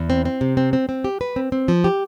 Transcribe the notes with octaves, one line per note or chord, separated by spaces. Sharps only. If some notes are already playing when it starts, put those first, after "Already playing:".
Already playing: E2
C4
C4
C3
C4
C4
C4
G4
B4
C4
C4
F3
G4